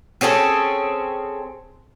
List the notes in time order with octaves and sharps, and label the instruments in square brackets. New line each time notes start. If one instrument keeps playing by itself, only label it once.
[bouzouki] C4 C#4 G#4 A4